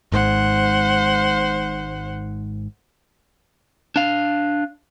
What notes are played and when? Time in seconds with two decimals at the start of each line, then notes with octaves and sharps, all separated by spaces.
0.12 G#1 G#2 C5 F#5
3.96 D4 F5